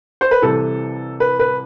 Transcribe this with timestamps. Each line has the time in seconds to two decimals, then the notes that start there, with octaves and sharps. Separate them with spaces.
0.21 C5
0.31 B4
0.42 C2 C3 E3 A4
1.20 B4
1.39 B4